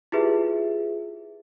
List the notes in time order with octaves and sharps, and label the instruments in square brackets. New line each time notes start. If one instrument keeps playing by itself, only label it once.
[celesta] E4 F4 G4 G#4 B4 E5